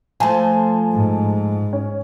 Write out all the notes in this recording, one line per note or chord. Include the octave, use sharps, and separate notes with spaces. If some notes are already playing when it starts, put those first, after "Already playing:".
F3 A3 G#5 A5
G#2
C#4